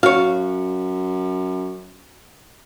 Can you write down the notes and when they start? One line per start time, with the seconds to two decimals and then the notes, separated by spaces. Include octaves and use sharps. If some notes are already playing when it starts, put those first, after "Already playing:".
0.03 F#2 F#4 C#5 F5